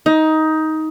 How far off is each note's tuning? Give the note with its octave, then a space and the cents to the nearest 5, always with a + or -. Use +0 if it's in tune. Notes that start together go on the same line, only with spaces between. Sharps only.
D#4 +15